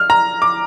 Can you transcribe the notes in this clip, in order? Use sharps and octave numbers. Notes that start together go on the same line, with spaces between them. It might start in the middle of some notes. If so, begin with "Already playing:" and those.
Already playing: F6
A#5
D6